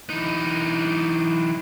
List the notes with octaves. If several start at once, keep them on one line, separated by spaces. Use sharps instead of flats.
E3 D#4